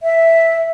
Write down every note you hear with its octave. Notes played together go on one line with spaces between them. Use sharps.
E5